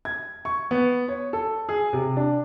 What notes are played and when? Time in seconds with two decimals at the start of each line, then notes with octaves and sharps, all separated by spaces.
0.05 G#6
0.45 C#6
0.71 B3
1.08 C#5
1.33 A4
1.69 G#4
1.93 C3
2.17 D4